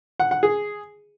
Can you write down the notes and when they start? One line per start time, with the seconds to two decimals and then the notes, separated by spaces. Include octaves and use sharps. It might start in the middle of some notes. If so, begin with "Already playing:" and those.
0.20 F#5
0.31 F#5
0.43 G#4